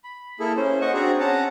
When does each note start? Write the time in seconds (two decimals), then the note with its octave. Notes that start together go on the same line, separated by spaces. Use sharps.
0.04 B5
0.40 A#3 E4 G#4 A4
0.56 C#4 C5
0.81 D#5 F#5 C#6
0.94 C4 D4 F#4 G#4 A#5
1.20 C#4 F#5 A5 A#5